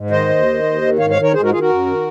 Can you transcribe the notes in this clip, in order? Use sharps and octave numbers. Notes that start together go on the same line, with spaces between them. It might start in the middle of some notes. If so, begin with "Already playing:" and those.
Already playing: G#2
D#3 C5 D#5
D#2
D#3
D#2
D#3
G#2 C#5 F5
C#5 F5
D#3
A#4 C#5
G#2 G#4 C5
F#4 A#4
D#3 F4 G#4
F#4 A#4
F#2
D#3